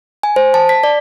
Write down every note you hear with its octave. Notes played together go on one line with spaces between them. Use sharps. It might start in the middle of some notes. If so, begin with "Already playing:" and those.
G#5
C5
A5
B6
D5